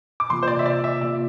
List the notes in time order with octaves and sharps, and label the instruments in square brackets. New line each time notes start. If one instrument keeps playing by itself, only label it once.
[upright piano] D6
[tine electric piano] C3 E3 A#3 F4 [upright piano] C6
[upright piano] C5
D5
E5
D5
E5
[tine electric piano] C3 E3 A#3 F4 [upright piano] D5